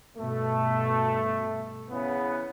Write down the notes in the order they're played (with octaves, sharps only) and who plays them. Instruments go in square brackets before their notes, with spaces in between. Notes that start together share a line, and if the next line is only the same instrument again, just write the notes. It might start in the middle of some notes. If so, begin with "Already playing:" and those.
[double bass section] G2 B2 [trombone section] A3
[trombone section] E2 C#3 B3